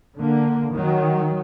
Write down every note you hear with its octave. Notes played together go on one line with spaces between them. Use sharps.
D3 A#3
D#3 F#3